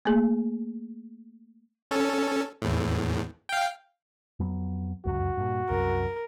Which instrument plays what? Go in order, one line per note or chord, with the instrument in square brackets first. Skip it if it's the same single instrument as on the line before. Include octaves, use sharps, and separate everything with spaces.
[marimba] A3 A#3 G#4
[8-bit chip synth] C#4 A4
E2 A2
F5 G5
[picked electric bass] F2 F#3 B3
[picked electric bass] F1 C#2 F#2 [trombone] F#4
[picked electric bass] G2 A#2
[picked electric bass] C2 F#2 [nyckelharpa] A#4